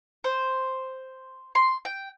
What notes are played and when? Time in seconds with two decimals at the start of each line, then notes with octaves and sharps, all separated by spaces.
0.24 C5
1.55 C6
1.85 G5